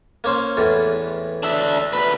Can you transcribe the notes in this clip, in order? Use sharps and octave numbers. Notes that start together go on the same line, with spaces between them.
A#3 C#4 C5
E2 A2 E3
D4 E5
D2 B4